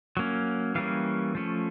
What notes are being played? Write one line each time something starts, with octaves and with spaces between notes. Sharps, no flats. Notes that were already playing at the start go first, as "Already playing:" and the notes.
F#3 A#3 C#4
E3 G3 A#3 C#4 F5
F3 A3 C#4